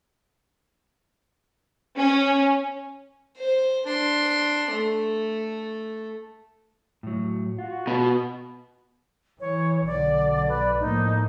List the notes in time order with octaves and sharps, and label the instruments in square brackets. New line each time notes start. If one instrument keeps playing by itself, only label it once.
[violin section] C#4
[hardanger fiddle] C5
D4 C6
A3
[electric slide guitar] A2 F#3
[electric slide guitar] F4 [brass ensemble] F#4
[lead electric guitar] B2
[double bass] E3 [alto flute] C#5
[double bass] B1 [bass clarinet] D3 [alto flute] D5
[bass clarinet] B4 [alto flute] D5
[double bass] A2 A#3 [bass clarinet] F3 [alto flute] D#4